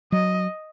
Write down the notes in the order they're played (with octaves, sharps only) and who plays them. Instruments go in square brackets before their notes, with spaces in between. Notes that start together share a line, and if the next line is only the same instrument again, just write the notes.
[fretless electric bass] F#3 [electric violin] D#5